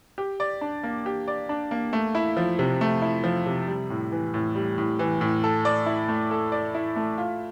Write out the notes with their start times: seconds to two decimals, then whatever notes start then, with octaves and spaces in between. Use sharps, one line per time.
0.18 G4
0.40 D5
0.61 D4
0.83 A#3
1.06 G4
1.28 D5
1.49 D4
1.71 A#3
1.93 A3
2.15 E4
2.37 F3
2.59 C3
2.81 A3
3.02 E4
3.24 F3
3.46 C3
3.68 G3
3.90 A2
4.12 E3
4.34 A2
4.55 G3
4.78 A2
4.99 E3
5.21 A2
5.44 A4
5.65 D5
5.86 E4
6.08 A3
6.31 A4
6.52 D5
6.75 E4
6.96 A3
7.18 F4